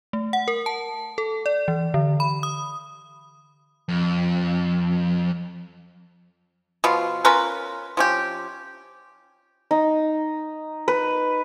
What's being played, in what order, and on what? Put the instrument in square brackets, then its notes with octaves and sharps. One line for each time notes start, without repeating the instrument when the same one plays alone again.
[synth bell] A3
F#5
A#4
A5
A4
D5
E3
D3
B5
D#6
[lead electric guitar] F2
[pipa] B2 F3 F4
C#4 F4 A#4 B4
F3 C#4 G4
[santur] D#4
B4